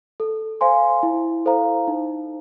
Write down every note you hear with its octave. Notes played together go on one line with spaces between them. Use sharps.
A4
C5 F5 G#5 C6
E4
A4 C5 F5 A#5
D#4